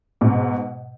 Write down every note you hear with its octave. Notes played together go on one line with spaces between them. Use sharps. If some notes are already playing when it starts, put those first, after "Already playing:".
G#2 B2